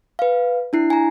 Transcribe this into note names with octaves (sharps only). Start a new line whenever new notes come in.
B4 F5
D4 E4 C7
G#5 A#5